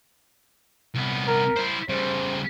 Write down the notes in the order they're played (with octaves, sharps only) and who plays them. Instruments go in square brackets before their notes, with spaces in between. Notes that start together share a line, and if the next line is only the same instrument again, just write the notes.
[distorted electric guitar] C2 B3
[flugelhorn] A#4
[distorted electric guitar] E4 C5
[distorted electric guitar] C#3 G3 [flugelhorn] C5